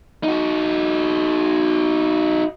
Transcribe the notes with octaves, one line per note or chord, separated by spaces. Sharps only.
D#4 F#4